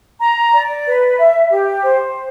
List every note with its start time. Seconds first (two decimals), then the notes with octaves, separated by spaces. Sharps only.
0.21 A#5
0.53 D5
0.86 B4
1.19 E5
1.51 G4
1.83 C5